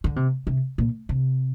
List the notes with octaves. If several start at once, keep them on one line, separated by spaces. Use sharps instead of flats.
D3
C3
C3
A#2
C3